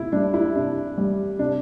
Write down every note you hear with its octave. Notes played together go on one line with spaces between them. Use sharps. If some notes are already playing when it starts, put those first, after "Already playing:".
Already playing: C3 E4
G3 D4
E4
C3 D4
G3
C3 D4